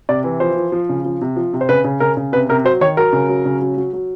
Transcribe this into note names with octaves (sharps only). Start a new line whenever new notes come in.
C3 D5
E3
F3 C5
F3
F3
C#3
F3
C3
F3
C3
C5
C#3 B4
C#3
C#3 A#4
C#3
C3 B4
C3 A#4
F#3 C5
D#3 C#5
F#3 A#4
C#3
F#3
C#3
F#3
F#3
F#3